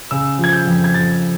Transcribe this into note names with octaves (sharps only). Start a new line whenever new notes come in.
C#3 E6
F3
G#6
G6
F2
G#6
F2 A6